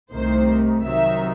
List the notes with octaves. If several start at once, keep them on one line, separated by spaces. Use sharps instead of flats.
C2 C3 D#3 A3 C5
C3 D#3 F#3 E5